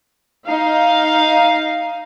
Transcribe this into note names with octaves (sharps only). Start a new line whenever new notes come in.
D#4 F5